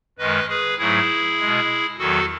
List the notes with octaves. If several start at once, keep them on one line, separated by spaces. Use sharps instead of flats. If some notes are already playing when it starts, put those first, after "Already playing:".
F#2 D#3 G#3 B4 D#5
G#4 B4
G#2 F#3 A3 E4 G#4
B2 G#3
E2 D#3 F#3 F#4 A4